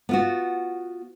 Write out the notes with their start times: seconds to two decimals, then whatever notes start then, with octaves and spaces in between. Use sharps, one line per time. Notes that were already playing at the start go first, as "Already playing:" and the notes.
0.09 B3 F4 F#4